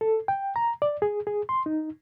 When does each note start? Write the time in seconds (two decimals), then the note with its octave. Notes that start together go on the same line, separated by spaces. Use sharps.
0.01 A4
0.28 G5
0.56 A#5
0.82 D5
1.02 G#4
1.27 G#4
1.49 C6
1.66 D#4